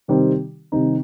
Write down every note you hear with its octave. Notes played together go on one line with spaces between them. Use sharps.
C3 D#3 G3 C4 D#4
C3 D#3 G3 C4 D#4